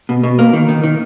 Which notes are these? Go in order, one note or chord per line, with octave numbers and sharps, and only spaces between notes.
B2
B2
A#3
D#3
D#3
D#3